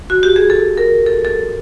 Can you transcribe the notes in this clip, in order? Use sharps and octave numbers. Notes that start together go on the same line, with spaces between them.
F#4
G4
G#4
A4
A#4
A4
A4